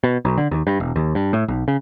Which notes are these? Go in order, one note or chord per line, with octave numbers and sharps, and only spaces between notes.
B2
B1
D3
D#2
G2
E1
D#2
G2
A2
B1
C#3